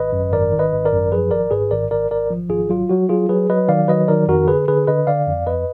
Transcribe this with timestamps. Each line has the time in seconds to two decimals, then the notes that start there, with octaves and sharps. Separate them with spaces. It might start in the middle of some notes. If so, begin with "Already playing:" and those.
Already playing: G#1 B4 D#5
0.13 F#2
0.32 G#1 A#4 D5
0.52 D#3
0.59 B4 D#5
0.72 G#1
0.85 A#4 D5
0.92 F#2
1.12 F3 G#4 B4
1.31 G#1 A#4 D5
1.51 G#2 G#4 B4
1.71 G#1 A#4 D5
1.91 G#1 A#4 D5
2.10 G#1 A#4 D5
2.30 F3
2.50 G#1 F4 G#4
2.69 F#3 F4
2.89 F#3 F#4
3.09 F#3 F4 G#4
3.29 F#3 G#4 B4
3.49 F#3 B4 D#5
3.68 D#3 D5 F5
3.88 F#3 B4 D#5
4.08 D#3 A#4 D5
4.28 F2 F#4 A#4
4.48 D3 G#4 B4
4.68 D3 G#4 B4
4.87 D3 B4 D#5
5.07 D3 D5 F5
5.27 F2
5.47 F2 B4 D#5